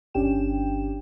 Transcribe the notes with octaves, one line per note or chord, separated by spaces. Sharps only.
G1 C#4 D4 G4 G5 E7